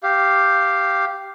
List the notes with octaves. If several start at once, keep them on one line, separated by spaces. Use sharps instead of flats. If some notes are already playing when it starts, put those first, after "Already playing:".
G4 F5